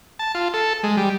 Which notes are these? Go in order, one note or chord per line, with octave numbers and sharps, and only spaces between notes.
A5
F4
A4
G#3
G3